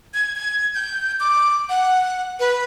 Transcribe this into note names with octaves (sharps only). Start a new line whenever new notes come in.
G#6
G#6
G6
D6
F#5
B4